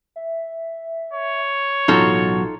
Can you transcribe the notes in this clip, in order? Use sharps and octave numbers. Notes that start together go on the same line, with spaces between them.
E5
C#5
A1 B2 F#3 D#4 F4 F#4 A4